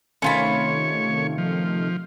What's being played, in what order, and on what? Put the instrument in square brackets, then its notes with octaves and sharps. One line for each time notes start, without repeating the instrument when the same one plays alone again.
[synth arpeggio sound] C3 D#3 A3 [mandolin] C#4 F4 B5 [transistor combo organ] C#5
[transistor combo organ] F3